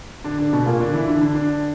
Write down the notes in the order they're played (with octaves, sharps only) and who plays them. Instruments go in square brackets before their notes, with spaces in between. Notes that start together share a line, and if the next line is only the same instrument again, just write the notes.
[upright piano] D3 D4
D3 D4
B2 B3
A#2 A#3
D3 D4
E3 E4
D3 D4
D3 D4
D3 D4